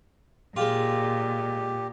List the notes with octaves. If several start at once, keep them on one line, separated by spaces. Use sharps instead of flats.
A#2 G#3 F4 G4